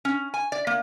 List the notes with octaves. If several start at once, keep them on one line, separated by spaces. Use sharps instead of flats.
C#4
G#5
D5
A#3